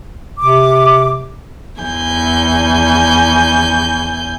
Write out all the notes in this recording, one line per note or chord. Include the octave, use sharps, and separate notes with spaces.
C3 D6
E2 G#5 G6